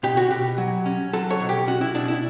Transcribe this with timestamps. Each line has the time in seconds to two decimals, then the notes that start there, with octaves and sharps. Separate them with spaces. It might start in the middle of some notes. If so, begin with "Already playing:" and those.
0.03 B2 G4
0.17 F#4
0.30 B2 G4
0.58 F#3
0.86 C#4
1.13 F#3 A4
1.30 C#5
1.40 B2
1.49 G4
1.67 C#4 F#4
1.81 E4
1.95 B2 D4
2.08 E4